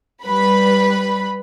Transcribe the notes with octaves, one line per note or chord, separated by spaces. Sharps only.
G3 B4 B5